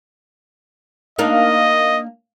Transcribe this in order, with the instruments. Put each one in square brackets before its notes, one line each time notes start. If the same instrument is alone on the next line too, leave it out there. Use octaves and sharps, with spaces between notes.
[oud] A#3 D4 D#4 [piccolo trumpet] D#5